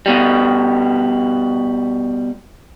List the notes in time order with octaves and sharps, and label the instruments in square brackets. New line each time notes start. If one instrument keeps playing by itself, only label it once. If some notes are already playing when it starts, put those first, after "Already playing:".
[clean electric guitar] B2 G3